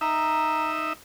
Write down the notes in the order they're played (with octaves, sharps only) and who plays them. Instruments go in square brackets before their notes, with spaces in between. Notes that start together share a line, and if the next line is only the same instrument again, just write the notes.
[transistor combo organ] D#4 E5 [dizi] A#5